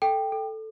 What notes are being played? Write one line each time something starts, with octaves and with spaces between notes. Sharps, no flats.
A4 G5
A4